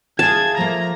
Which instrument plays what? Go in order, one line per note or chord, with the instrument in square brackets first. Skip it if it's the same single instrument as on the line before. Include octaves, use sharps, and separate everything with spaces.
[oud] E2 A#3 G#4 [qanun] A5 [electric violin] G#6
[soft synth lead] F3 [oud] A3 A#3 [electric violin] A#5